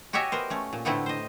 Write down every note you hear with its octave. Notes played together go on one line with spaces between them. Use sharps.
F#4 G4 C#5 D#5 E5 G#5
B3 A#4 C5
A3 C#4
A#2
A2 D3 A3 B3 C4 E4
C5 D#5